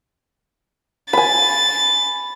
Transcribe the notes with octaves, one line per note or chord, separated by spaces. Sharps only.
G#5 B5 A6